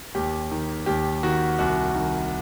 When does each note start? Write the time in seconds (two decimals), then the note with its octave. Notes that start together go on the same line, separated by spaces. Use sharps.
0.15 D#2 G4
0.51 D#3
0.86 D#2 G4
1.23 D#3 F#4
1.59 C2 F#4
1.95 D#3